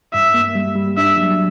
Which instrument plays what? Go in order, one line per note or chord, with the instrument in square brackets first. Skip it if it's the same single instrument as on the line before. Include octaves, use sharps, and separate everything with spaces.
[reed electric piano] G2 [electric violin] E5
[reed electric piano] A#3
G3
G3
[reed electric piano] D4 [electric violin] E5
[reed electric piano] F#3